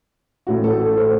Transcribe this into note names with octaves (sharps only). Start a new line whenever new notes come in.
A1 A2 A3 F#4
A4
A4
A4 C5